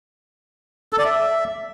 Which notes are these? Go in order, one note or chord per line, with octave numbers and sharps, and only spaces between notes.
A4
D5
E5